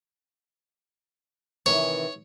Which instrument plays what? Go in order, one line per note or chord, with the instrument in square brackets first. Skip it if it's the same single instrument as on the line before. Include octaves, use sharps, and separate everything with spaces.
[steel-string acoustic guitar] C3 D#3 E3 [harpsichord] C#5